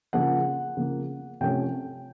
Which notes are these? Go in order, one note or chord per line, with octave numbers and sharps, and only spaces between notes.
C#3 F3 A#3 F#5
C#3 F3 A#3
C3 F3 A3 C#4 G5